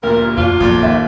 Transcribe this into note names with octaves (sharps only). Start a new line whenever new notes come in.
D2 G2 A#2 A#4
F2 F#3 D4 F4
F2 A#2 F3 D5
D#2 C#4 E5